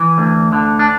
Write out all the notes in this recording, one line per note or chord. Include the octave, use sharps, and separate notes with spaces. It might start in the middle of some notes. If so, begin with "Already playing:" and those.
Already playing: E3
D2
D3
D4